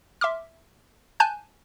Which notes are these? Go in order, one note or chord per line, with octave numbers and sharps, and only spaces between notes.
E5 C6 D6 F6
G#5 A5 F#6 G6